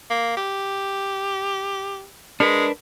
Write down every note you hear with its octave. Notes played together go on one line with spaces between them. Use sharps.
A#3
G4
G#3 D4 A#4 B4